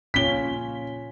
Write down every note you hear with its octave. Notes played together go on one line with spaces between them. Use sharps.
A#2 C#4 F4 B6 G7